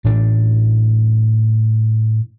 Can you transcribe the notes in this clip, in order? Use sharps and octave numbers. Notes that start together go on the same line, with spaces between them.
A2 E3 D4